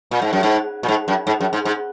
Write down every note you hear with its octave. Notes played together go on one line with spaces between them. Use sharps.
A#2
G#2
F#2
G#2
A#2
G#2
F#2
G#2
F#2
G#2
G#2